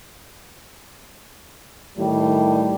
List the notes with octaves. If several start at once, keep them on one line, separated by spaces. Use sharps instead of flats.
A2 D#3 G3